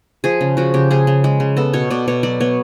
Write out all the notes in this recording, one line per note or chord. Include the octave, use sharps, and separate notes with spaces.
F3 G#4
C#3
F3 F#4
C#3 G4
C#3 G#4
C#3
G#3
C#3
B3 A4
B2 C#5
B2 D5
B2 C#5
F#3 D5
B3 C#5